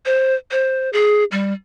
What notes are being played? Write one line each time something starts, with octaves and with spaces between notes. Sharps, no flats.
C5
C5
G#4
G3